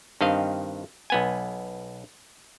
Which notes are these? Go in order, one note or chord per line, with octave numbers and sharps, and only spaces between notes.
G2 D#3 C4 D#5 F5
B1 B3 G#5